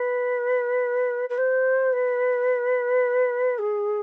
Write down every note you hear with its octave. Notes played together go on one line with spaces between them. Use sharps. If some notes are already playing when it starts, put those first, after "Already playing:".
Already playing: B4
B4
C5
B4
G#4